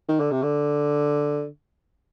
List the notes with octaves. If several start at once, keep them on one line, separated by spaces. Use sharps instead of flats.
D#3
D3
C3
D3